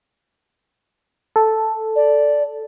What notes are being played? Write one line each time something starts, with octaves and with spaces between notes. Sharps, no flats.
A4
D5